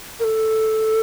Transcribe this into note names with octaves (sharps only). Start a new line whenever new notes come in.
A#4
A4